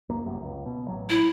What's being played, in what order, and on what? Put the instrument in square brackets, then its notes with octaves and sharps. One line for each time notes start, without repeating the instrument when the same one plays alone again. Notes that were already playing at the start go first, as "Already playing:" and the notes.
[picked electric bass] C#2 F#2 A#3
G1 C2 F#2
C#2
B2
A1 F#3
[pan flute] E4